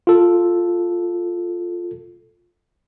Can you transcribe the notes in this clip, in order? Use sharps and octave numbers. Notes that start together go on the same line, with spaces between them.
F4 A4